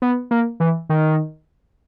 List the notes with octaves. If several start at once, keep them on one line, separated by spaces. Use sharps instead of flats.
B3
A#3
E3
D#3